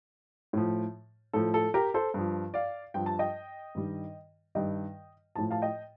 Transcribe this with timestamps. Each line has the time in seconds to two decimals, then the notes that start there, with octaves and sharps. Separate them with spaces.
0.53 A2 F3
1.33 A2 F3 A4
1.54 A4
1.74 G4 A#4
1.94 A4 C5
2.14 G2 F3
2.54 D5 F5
2.94 G2 F3 G5
3.06 A5
3.19 D#5 G5
3.75 G2 D#3 G3
4.55 G2 D#3 G3 D#5 G5
5.36 A2 F3 A5
5.51 F5 A5
5.62 D#5 G5